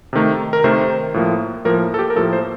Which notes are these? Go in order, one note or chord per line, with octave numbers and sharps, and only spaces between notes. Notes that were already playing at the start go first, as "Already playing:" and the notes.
C3 D#3 A3
A#4
C3 D#3 A3 C5
A2 F3 A#3
A2 F3 A#3 A#4
A4
G4
A#4
A2 F3 A#3 A4
C5